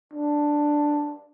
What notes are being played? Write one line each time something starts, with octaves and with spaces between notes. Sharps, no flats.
D4